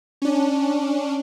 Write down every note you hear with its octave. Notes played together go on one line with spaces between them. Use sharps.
C#4 D4